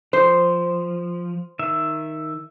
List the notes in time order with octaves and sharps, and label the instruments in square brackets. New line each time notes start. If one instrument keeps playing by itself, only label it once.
[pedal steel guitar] F3 [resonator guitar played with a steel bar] C5
[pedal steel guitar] D#3 E5